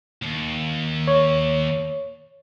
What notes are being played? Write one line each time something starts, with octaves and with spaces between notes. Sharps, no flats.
D#2
C#5